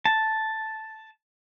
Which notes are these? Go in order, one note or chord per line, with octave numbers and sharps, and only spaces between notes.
A5